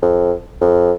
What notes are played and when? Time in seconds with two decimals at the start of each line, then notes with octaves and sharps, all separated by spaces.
0.02 F2
0.61 F2